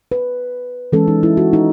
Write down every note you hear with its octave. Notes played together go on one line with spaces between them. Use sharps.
B4
E3 G#3 C#4 A4
D#4
E4
F#4
D#4